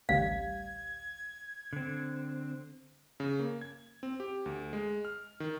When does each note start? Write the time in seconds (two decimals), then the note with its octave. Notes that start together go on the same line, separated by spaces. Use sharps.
0.09 A1 D2 G3 F5 G#6
1.73 D3 C4
3.20 C#3
3.39 A#3
3.61 G#6
4.03 C4
4.20 G4
4.46 D2
4.73 G#3
5.05 F6
5.40 D#3